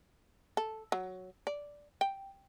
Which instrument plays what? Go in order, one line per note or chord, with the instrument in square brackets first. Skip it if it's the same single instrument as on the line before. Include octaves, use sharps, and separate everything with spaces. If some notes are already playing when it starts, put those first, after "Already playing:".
[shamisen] A4
F#3
D5
G5